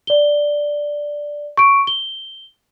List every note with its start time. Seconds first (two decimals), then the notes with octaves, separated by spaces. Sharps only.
0.07 D5 G7
1.57 C#6 D7
1.87 G7